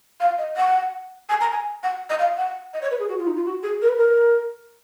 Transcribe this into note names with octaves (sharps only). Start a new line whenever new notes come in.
F5
D#5
F#5
G#5
A#5
G#5
F#5
D#5
F5
F#5
D#5
C#5
B4
G#4
F#4
F4
D#4
F4
F#4
G#4
A#4
B4
A#4